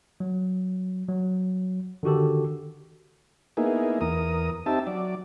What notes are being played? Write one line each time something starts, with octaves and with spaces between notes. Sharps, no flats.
F#3
F#3
D3 D#3 F#4 G4 A4
A#3 B3 D#4 E4 G#4
E2 A#4 D#6
C4 D#4 G4 E5 A5
F#3 D5